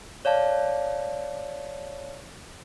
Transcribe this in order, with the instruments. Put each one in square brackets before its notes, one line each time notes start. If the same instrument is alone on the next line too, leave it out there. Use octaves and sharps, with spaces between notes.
[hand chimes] C#5 D5 F5 A5